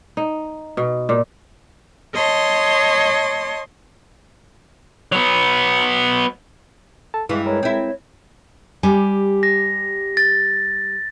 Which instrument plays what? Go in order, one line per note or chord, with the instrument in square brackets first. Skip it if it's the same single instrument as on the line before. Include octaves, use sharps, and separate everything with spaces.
[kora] D#4
B2
A#2
[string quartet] C#5 D#5 A5 C6
[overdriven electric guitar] F#3 B3
[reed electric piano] A4 A5
[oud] G2 E3 [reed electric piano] G#3 F5
[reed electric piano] G#3 A#4 B4 [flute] C#5
[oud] C4 E4
[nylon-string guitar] G3 G4 G#5
[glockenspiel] A#6
A6